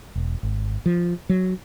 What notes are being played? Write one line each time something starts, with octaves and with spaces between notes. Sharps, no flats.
E1
G#1
F3
F#3